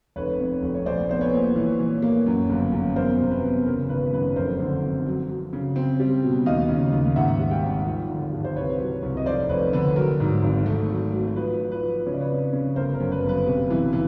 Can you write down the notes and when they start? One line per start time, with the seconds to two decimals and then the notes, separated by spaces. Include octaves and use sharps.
0.16 F1 B4 C#5
0.39 F2
0.63 F1
0.75 C#5
0.86 A#1 C5 D5
1.09 B3 C5
1.21 B4 C#5
1.33 A#2
1.56 E3
1.79 E3
2.02 A#3
2.27 F#2
2.50 G1
2.72 F#2
2.96 E2 A#4 C5
3.19 C3
3.31 B4
3.42 E2
3.66 C#3 A#4
3.89 G#1 B4
4.13 F#2 B4
4.36 F1 A#4 C5
4.60 D3
4.83 F2
5.06 F#3
5.29 F#3
5.53 C#3
5.76 C4
6.00 G3
6.23 B2
6.46 D#2 D#5 F5
6.69 C#3
6.93 D#2
7.16 G#2 E5 F#5
7.39 G3
7.51 F5 G5
7.63 G#1
7.86 F3
8.10 D3
8.32 G2
8.44 C5
8.56 C2 B4 C#5
8.80 F#3
9.03 C2
9.17 D#5
9.26 F1 C5 D5
9.49 F1 B4 C#5
9.73 D3 B4
9.96 F#3 A#4
10.20 G#2
10.43 G#1
10.66 A3
10.90 F#3
11.13 F#3
11.36 F3 B4
11.60 F3
11.71 B4
11.83 F3
12.06 C#3 C#5
12.14 D5
12.20 B4 C#5
12.30 F2
12.53 C#3
12.76 G1 A#4 C5
12.94 A#4
13.00 F#2
13.12 B4
13.23 G1
13.29 B4
13.47 C3
13.70 E3
13.93 E3